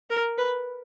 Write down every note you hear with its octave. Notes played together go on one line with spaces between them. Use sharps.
A#4
B4